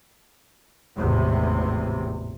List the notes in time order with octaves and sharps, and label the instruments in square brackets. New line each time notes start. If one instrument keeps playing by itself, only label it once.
[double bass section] G#1 E2 A2 C3